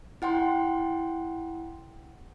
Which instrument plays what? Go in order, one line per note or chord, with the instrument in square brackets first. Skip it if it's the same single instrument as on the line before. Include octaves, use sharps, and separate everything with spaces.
[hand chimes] E4 F#5 G5 C6